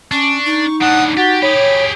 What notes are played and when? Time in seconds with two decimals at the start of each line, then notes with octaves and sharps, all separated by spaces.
0.11 C#4 D4 C#6
0.45 D#4
0.81 A2 D4 F#5 D#6
1.17 F#4 G4 A6
1.42 G4 G#4 C#5 B5